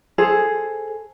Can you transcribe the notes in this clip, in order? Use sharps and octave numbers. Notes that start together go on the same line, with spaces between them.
G#4 A4 C5